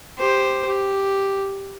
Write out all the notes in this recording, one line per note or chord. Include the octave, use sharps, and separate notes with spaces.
G4 C5
G4